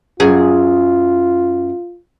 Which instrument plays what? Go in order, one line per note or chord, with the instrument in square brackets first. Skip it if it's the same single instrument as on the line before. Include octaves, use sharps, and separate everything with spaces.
[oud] F#2 G#4 [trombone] F4